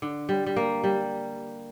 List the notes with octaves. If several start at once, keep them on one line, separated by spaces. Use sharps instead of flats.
D3
G3
G3
A#3
G3